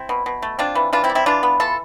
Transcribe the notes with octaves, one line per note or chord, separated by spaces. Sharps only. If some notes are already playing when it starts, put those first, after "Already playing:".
Already playing: C4 E4
B2
B2
A3
C4 D4 F4
E3
E3 D4 F4
C4 E4
G3
C4 E4
E3 D4 F4
B3
E3 F4 A4